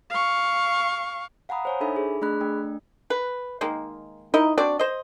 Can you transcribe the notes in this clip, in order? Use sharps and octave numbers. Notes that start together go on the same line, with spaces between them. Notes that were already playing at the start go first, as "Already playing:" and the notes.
F5 C#6
F5 F#5 G#5 A#5 B5 D#6
C5 C#5 G#5
D4 D#4 A4 E5 G#5 B5
G#4
A3 D4 G#4 B5 F#6
A3 D4 G5
B4
D#3 G#3 A#3
D#4 E4 A#4 D#5
C4 D4 F#4 D5
C5 D#5